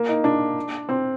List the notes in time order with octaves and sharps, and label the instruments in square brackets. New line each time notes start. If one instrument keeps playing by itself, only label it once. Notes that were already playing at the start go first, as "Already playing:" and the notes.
Already playing: [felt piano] A#3
D#4
D4
C4